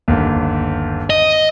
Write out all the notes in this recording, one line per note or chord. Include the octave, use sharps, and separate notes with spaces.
G1 D#2
D#5